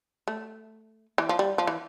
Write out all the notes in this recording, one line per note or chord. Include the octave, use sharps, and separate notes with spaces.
A3
E3
F3
G3
F3
E3